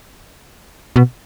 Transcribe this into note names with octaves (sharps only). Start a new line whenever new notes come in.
B2